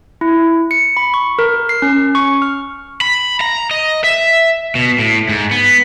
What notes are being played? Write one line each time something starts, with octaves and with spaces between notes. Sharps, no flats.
E4
C#7
B5
C#6
A#4
C7
C#4
C#6
F6
B5
A#5
D#5
E5
B2
A2
G#2
B3